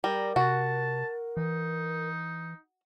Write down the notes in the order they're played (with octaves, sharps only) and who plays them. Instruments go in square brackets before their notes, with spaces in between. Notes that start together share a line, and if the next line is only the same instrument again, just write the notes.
[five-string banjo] G3 [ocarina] A#4 [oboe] A#5
[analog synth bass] C3 [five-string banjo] F#4 [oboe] A5
[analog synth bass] E3 [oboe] D#4